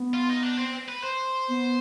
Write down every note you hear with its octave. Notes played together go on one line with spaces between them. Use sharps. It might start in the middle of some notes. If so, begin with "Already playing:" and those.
Already playing: B3
F4
D#4
D4
C4
B4
C5
B3